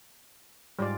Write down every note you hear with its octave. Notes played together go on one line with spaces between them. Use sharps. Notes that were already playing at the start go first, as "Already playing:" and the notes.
G#2 G3 G#3 F4 D5